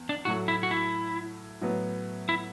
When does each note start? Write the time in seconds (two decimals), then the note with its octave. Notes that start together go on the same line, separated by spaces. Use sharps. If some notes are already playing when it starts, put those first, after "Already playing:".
Already playing: E2
0.09 D4
0.25 A2 F#3 A3 F#4
0.48 E4
0.63 F#4
0.71 E4
1.61 A2 F#3 B3
2.29 E4